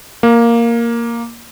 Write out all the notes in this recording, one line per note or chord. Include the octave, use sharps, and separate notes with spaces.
A#3